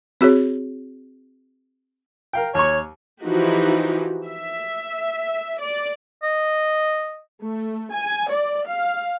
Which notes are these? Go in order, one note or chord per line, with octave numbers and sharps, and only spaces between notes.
C4 F#4 G#4 C#5
A#4 F5 G5
D#2 C#5 C#6
E3 F3 D#4 F#4 G4
E5
D5
D#5
A3
G#5
D5
F5